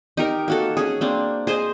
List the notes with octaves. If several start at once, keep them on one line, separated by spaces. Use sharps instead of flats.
D#4 G4 A#4
A#3 F#4 A4
C#4 G#4
A#3 C4 D4
G#4 C5 D#5 G#5